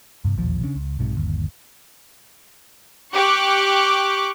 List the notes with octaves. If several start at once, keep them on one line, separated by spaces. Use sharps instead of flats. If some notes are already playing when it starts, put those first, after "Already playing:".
G2 C3
E1 A#1 D#2 F3
C#3 C#4 D4
C#2
B1 G#2 C3
G1 D#2
G4 C#6 D6 F#6